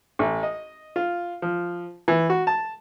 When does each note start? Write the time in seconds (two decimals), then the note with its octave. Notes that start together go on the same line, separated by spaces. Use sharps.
0.19 A1
0.43 D#5
0.96 F4
1.42 F3
2.08 E3
2.30 F#4
2.47 A5